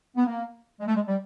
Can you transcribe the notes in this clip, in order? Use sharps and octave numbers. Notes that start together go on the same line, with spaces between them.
B3
A#3
G#3
A3
G#3
G3